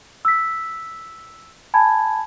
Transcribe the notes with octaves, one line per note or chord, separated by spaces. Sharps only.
E6 B6
G#5 A5 B5 G#6